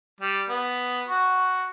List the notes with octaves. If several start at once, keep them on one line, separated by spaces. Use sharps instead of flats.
G3
B3
F#4